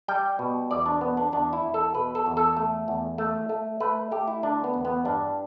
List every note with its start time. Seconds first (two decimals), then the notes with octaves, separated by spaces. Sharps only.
0.08 G3 G5
0.39 B2
0.71 E2 D5
0.86 D4
1.01 B2 B3
1.17 D4
1.32 E2 D4
1.53 E4
1.63 E2
1.74 A4
1.94 B2 B4
2.15 A4
2.26 E2
2.37 A4
2.57 A3
2.88 E2
3.18 A3
3.49 A3
3.80 A3 B4
4.12 A3 G4
4.28 E4
4.43 D3 D4
4.64 B3
4.74 E2
4.85 B3
5.05 G2 D4